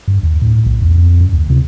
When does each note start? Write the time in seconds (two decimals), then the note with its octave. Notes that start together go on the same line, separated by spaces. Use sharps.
0.08 G2
0.23 D#2
0.42 A2
0.66 B1
0.82 E2
0.97 F2
1.21 F#2
1.33 D2
1.50 C3